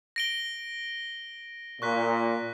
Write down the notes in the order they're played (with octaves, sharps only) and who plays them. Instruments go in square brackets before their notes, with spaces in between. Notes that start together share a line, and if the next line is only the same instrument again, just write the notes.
[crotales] A#6 D7 G7
[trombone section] A#2 [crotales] C#6 F#6 B6